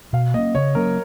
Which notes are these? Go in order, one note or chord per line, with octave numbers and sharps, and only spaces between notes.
B2 F5
A#3 C#4 D#5
C#3 C#5
F#3 A#3 C#4 A#4